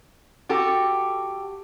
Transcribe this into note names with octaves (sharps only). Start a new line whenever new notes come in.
F#4 G4 A4